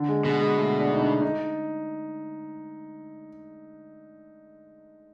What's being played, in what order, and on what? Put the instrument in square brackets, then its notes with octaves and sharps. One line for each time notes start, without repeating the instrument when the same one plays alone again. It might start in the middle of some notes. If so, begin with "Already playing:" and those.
Already playing: [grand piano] D3
G#3
[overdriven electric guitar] B2 [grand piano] G#3
[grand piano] G#3
A3
D4
D#4
D4
D#4